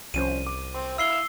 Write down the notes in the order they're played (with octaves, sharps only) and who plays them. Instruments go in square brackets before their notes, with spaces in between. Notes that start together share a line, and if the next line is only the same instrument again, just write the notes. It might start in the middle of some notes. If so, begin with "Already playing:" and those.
[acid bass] C2 [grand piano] F3 C#4 C5 [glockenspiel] D#7
[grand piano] D6
[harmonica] C4 [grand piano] C6
[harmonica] E4 E5 F5 [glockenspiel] E6 C7 G7